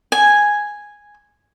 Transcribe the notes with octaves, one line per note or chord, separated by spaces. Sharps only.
G#5